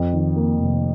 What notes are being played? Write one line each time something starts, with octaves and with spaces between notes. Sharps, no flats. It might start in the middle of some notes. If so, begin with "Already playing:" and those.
Already playing: F2
D#3
A#3
F1